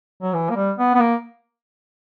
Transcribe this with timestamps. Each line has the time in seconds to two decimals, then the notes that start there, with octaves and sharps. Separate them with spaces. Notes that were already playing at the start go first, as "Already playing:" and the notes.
0.22 F#3
0.33 E3
0.50 A#3
0.56 G3
0.78 B3
0.95 B3
1.00 A#3